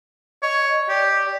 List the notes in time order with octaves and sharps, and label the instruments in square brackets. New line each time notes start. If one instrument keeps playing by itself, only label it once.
[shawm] C#5 [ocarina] D#5
[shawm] G4 [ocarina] D5